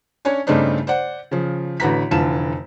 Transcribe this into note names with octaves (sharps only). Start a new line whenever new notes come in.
C#4 D4 C#5 G#5
G2 C#3 A3 C4 D4 D#4
C5 D5 F#5
C#3 F3
A1 D3 F#4 B4 A#5 B6
F1 D3 E3 F4 A5 E7